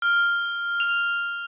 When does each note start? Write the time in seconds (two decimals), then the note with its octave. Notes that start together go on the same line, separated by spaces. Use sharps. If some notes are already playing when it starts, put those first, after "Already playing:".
0.02 F6
0.80 F7